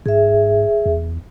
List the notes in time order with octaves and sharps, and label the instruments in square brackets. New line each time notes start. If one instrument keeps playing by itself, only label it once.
[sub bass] G#2 [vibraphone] G#4 E5
[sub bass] E2